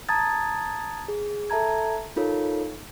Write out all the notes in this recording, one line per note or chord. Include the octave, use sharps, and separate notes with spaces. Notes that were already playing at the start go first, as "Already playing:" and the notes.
A5 A#5 D#6 G#6 A6
G#4
A4 E5 A5 A#5 G#6
D#4 F4 A4 A#4 C#5